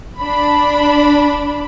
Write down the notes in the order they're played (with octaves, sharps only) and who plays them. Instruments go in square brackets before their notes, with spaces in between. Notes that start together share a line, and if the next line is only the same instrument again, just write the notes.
[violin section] D4 B5